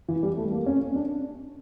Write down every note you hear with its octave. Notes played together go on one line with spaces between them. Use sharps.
E3
G3
A3
A#3
C#4
D4